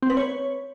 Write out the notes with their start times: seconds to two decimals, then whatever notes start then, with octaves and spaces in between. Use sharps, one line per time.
0.03 C4
0.10 B4
0.17 C#5